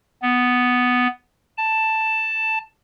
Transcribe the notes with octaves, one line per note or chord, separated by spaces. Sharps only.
B3
A5